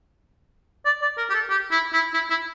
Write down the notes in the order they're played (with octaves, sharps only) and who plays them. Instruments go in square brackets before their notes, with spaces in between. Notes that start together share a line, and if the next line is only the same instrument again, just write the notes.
[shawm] D5
D5
A#4
G4
A4
G4
E4
E4
E4
E4